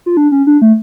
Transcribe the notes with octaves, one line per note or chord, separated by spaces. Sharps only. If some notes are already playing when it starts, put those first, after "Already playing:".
F4
D4
C#4
D4
A3